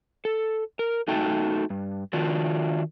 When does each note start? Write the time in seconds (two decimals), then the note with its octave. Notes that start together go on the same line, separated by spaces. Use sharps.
0.25 A4
0.79 A#4
1.08 A3 D#4 F#4 A4 G5 A5
1.70 G2
2.13 D#3 D4 F4 F#4